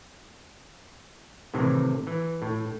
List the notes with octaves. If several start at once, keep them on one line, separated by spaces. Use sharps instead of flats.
A2 C3 D#3 E3
E3
A2